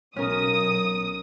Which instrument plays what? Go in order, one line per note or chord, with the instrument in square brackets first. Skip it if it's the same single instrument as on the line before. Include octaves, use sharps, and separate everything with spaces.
[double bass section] B1 [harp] C#4 A#4 [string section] D#6